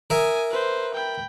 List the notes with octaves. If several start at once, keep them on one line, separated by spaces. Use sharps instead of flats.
A#4 E5 G#5 D#6
B4 C5
G5 B5